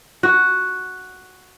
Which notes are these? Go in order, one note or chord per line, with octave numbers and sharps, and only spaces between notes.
F#4